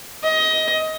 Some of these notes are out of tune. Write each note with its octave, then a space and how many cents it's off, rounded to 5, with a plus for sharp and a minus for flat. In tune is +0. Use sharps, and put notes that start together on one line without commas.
D#5 +20